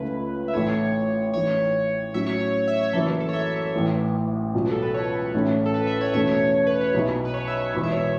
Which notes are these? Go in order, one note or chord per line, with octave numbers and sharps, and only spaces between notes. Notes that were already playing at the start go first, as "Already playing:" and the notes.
Already playing: C#2 C#3 A3 E4 B4
E5
A1 A2 A3 E4 C#5
A1 A2 E3 C#5
A2 F#3 C#4 E5
C#5
C#5
C#5
E5
C#5
F#1 F#2 E3 A4
A4
C#5
E5
A1 A2 E3
C#2 B2 F#3
A4
B4
C#5
A1 A2 A3 C#4 E4
A4
B4
E5
C#5
E2 B2 A3 C#4 E5
C#5
B4
C#5
B1 B2 B3 E4
B4
C#5
E5
C#5
E1 E2 B2
E5
C#5
E5